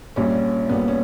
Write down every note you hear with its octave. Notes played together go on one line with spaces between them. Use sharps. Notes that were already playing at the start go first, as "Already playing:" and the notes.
A#1 A#2 G3 C#4
A#1 A#2 G3 B3
C#4